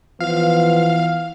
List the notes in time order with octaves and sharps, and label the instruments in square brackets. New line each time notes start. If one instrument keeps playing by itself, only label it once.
[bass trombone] E3 [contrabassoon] F3 [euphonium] B3 [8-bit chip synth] F5